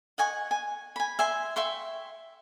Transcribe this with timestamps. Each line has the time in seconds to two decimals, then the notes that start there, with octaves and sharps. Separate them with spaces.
0.18 D#5 F#5 G#5 C#6
0.51 G#5
0.96 G#5 B5
1.19 E5 G#5 C6
1.56 E5 G5 C6 C#6